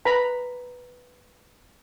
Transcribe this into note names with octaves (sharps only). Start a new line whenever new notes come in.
B4 A#5 B5